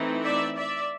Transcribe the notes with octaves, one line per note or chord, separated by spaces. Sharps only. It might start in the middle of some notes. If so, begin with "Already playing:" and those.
Already playing: E3 A3 C4 D#4
D5 E5
D5 E5